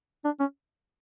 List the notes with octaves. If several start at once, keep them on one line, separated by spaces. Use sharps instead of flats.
D4
C#4